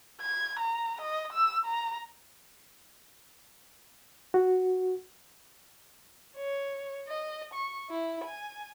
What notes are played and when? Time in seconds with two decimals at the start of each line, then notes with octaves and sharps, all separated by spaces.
0.21 G#6
0.59 A#5
1.01 D#5
1.33 E6
1.65 A#5
4.34 F#4
6.35 C#5
7.08 D#5
7.53 C#6
7.89 E4
8.25 G#5